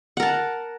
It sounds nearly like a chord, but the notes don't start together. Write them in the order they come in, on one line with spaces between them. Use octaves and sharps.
F#5 A#4 A5